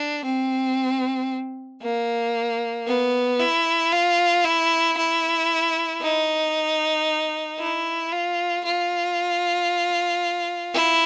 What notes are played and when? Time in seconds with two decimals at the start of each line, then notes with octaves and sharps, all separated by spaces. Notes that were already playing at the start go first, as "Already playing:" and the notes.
Already playing: D4
0.25 C4
1.83 A#3
2.87 B3
3.40 E4
3.93 F4
4.44 E4
4.98 E4
6.02 D#4
7.60 E4
8.12 F4
8.65 F4
10.74 E4